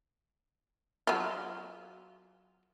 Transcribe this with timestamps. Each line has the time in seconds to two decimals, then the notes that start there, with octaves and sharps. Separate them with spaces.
1.07 F#3 F4